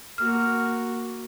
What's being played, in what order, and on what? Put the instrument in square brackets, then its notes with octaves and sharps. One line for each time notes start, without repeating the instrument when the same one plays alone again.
[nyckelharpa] A#3 F#4 [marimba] F6